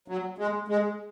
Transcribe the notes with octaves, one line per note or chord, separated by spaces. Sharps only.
F#3
G#3
G#3